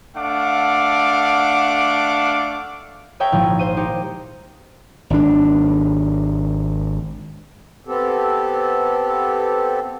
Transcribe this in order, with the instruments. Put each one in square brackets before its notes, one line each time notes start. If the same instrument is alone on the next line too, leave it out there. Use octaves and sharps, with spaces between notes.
[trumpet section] A3 D4 F5 F#5 D6
[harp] G#4 A#4 C#5 E5 G5
G#1 A#2 F3 E4
C5 D#7
D#4 G4 C#7
[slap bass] G#1 D4
[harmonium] B3 C4 G4 A4